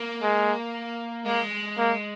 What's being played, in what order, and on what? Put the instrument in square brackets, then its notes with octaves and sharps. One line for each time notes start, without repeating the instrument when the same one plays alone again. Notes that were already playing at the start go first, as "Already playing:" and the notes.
Already playing: [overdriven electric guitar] A#3
[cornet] G#3
[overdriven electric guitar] G#3 [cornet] A#3
[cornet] A#3